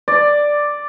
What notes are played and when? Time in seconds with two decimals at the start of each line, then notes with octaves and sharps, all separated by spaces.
0.08 D5